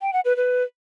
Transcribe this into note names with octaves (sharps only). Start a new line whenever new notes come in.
G5
F#5
B4
B4